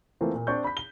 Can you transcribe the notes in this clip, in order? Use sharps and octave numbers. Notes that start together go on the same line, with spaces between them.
E3 A3 A#3 C4 F4
A#2
C4 D4 C#6 G6
B5 B6
G7